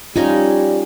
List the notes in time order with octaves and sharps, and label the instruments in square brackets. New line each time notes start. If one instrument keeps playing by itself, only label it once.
[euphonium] G3 [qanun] C#4 D#4 G#5 [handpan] F4